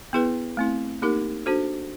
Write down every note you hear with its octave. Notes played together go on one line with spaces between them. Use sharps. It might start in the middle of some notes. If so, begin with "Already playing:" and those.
B3 E4 G#4 B4
A3 C4 E4
A#3 D#4 G4 A#4
D4 F#4 A4 C5